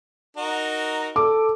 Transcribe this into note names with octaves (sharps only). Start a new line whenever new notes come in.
D#4 F#4 A#4
A4 D6